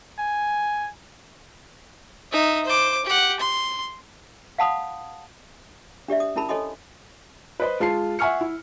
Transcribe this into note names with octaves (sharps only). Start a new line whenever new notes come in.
G#5
D#4 E5
C5 D6
G4 F#5
C6
F5 F#5 A5 B5 D#6
D4 G4 D5 E5
D#6
C#4 E4 A#4 A5 B5
A4 C#5 D#5 G#5 C6 D#6
B4 C5 D#5 B5
G#3 F4 A5 C6 C7
E5 F#5 G#5 C#6 F6 C#7
E4